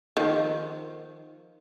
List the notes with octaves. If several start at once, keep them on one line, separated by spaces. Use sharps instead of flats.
D#3 F3